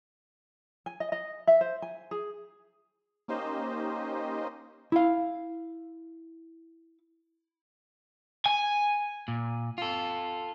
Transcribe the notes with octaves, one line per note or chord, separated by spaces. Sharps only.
G#5
D#5
D#5
E5
C5
G#5
G#4
A#3 C#4 D#4 G4 C5 D#5
E4 F5
G#5
A#2
F4 A4